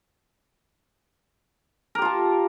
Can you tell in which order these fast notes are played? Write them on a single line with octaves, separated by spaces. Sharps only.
A#4 G4 F4 A5